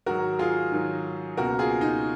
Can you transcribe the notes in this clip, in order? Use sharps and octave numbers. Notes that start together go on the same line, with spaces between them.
G#2 D#3 F#3 F#4 A#4
F4 G#4
G#2 D#3 F#3
C#2 B2 A#3 F#4 A#4
F4 G#4
D#4